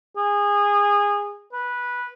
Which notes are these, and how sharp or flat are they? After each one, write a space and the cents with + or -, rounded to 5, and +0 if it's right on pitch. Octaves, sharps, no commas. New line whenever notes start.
G#4 -25
B4 -10